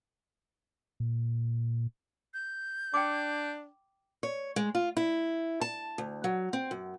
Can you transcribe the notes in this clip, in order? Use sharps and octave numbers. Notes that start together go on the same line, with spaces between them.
A#2
G6
D4 G5 D6
C#5
G#3
F4
E4
A5
D2
F#3
C4
F#2